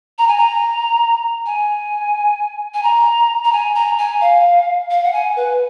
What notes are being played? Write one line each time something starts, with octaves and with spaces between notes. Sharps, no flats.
A#5
G#5
A#5
G#5
G#5
A#5
A#5
G#5
A#5
G#5
F5
F5
F#5
G#5
B4